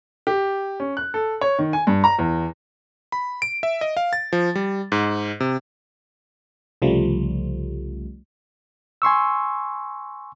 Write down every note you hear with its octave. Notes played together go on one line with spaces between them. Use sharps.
G4
C#4
F#6
A4
C#5
D#3
G#5
G2
A#5
E2
B5
D7
E5
D#5
F5
A6
F3
G3
G#2
C3
C2 C#3 F3 G3 A3
G#5 C6 C#6 E6